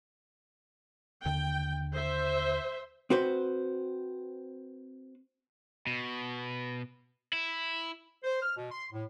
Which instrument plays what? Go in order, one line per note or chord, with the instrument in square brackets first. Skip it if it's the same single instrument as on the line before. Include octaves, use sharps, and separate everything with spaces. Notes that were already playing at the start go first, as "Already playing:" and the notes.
[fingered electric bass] D#2 D3 [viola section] G5
[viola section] C5 E5
[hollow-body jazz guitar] C4 F#4 B4 C5
[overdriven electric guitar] B2
E4
[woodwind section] C5
F6
B2
C6
A2